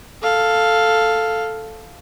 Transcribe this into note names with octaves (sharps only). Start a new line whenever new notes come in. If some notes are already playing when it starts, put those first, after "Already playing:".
A4 F5